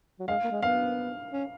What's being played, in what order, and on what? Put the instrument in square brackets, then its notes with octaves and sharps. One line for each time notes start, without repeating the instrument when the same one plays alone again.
[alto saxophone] F#3
[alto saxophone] G#3 [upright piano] F5
[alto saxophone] A#3
G#3
[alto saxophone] B3 [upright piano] F5
[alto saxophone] C#4